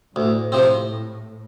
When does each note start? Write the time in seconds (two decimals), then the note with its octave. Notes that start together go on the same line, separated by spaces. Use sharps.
0.16 D2 A2
0.52 C3 F3 C4